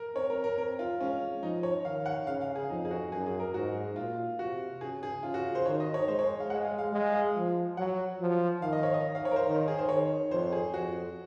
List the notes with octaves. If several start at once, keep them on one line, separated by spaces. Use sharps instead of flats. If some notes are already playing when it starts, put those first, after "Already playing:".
Already playing: A#4
C4 C#5
A#4
A#4
C4 A#4
F4
G#3 C#4
F3 D#4
C#5
D#3 F5
F#5
C#3 F5
F5
G#4
F2 D#4
G#4
F#4
F#2 G#4
G#4
A#4
G#2 F#4
A#2 F4
C3 F#4
C#3 G#4
G#4
C#3 F4
F#4
C5
D#3 C#5
D#5
C#5
G#3 C5
C#5
F5
G#3 F#5
F5
F5
G#3
F5
F3
F#3 F#5
F3
D#3 F5
D#5
C#5
D#5
F5
C#5
A#4
C5
D#3
G#4
C5
D#3 C#5
F2 C5
G#4
F2 F#4